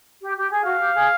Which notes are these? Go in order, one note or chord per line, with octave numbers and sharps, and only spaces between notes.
G4
G4
G#4
F#4 F5
G4
G#4